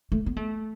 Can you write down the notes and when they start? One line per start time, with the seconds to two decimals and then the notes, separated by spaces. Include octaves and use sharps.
0.12 A3
0.26 B3
0.36 A3